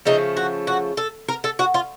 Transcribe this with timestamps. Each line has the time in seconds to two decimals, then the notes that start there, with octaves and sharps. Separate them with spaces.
0.05 C#3 F3 A3 D#4
0.37 F#4
0.67 F#4
0.97 A4
1.28 A#4
1.44 A4
1.59 F#4
1.74 F4